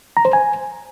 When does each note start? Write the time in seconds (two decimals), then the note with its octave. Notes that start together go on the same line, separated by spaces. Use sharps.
0.17 A#5
0.25 C5
0.33 G#5